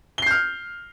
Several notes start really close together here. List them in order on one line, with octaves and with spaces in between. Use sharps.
G7 C7 G6 F6